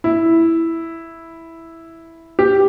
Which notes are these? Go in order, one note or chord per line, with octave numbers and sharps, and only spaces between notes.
E4
G4